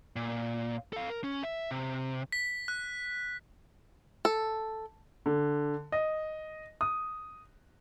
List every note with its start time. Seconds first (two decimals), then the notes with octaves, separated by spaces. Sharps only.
0.16 A#2
0.93 A4 F5
1.10 A#4
1.24 C#4
1.44 E5
1.71 C3
2.32 B6
2.68 F#6
4.25 A4
5.26 D3
5.92 D#5
6.81 D#6